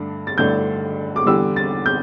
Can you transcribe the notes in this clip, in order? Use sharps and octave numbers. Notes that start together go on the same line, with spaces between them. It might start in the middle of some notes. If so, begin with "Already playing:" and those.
Already playing: G2 D3 A3 D4
A6
G2 D3 A3 D4 G6
D6
E2 D3 G3 E6
A6
G6